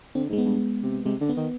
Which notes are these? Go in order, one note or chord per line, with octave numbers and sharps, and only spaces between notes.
D3 C4
G#2 G#3
B3
G2
C3
C3 G#3
D3
B3
D#3